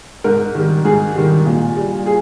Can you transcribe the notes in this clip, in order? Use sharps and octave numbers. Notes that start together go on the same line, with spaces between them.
G#2 A#4
D#3 G3
G#2 G#4
D#3 G3
A#2
G3
G#4